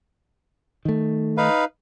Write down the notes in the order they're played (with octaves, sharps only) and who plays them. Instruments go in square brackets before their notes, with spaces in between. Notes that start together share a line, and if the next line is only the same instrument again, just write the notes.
[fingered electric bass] D#3 A3
[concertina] D#4 B4 F5